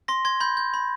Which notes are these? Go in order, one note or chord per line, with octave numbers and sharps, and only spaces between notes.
C6 A#6
C6 G#6
B5 G6
G6
B5